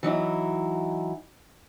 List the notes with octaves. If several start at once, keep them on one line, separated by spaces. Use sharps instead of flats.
E3 F#3 D#4 E4